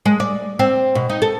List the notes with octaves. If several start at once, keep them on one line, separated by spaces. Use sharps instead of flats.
G#3
D5
C4
B2
D#4
A4